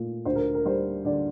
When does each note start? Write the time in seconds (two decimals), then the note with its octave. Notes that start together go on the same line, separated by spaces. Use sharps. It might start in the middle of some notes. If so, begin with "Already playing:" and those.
Already playing: A#2 A3
0.25 D2 C5
0.36 A#4
0.54 A#4
0.65 G3 C5
1.05 D3 D5